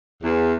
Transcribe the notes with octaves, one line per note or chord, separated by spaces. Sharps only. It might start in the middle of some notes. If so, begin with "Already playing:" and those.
E2